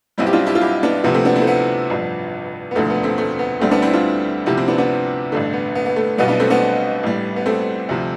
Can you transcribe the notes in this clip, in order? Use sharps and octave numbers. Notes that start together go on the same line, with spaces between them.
B1 B2 G3 C4 E4
G4
D4 F4
E4 G4
F4
E4 G4
B3 D4
D2 C3 F3 B3
A3 C4
B3 D4
C4 E4
A3
B3
A1 G2 F3
B3
E1 D2 D3 F3 A3
B3
A3 C4
A3
B3
D2 D3 G3 A3 C4
B3 D4
C4 E4
D4 F4
D2 C3 F3 E4 G4
C4 E4
B3 D4
B3 D4
A1 G2 D3 A3
B3
B3
B3
A3
B1 B2 G3 B3
B3 D4
A3 C4
B3 D4
A1 A2 G3
B3
A3 C4
D2 C3 F3